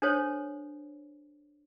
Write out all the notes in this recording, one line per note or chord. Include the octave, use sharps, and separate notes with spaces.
D4 A4 C5 C#5